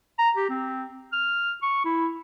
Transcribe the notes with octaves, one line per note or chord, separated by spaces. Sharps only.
A#5
G4
C4
F6
C#6
E4